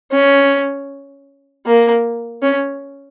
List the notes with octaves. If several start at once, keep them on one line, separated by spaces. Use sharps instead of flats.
C#4
A#3
C#4